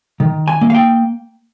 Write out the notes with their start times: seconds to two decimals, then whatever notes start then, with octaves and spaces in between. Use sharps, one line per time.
0.20 D#3
0.48 G#5
0.61 A#3
0.70 F5
0.75 G5